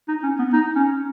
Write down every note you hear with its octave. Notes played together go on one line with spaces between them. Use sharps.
D#4
C#4
B3
D#4
C#4